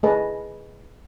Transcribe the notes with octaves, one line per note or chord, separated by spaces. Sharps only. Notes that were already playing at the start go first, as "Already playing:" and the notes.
A3 G#4 B4 D#5 A5